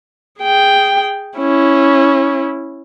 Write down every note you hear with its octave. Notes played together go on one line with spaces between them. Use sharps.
G#4 G5
C#4 E4